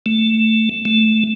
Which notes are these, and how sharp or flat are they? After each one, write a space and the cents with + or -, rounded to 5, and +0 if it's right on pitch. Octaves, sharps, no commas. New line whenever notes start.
A3 +10
A3 +0